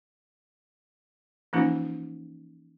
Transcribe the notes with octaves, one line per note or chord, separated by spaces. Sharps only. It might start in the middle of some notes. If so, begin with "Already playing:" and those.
E3 F3 A#3 C#4 D#4 F4